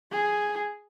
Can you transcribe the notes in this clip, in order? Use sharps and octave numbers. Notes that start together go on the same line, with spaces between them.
G#4